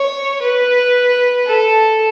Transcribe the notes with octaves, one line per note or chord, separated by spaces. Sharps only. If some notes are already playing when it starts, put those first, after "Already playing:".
Already playing: C#5
B4
A4